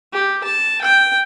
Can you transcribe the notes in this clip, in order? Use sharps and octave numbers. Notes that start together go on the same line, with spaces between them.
G4
A5
G5